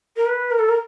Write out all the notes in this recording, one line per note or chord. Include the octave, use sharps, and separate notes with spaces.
A#4
B4
A#4
A4
A#4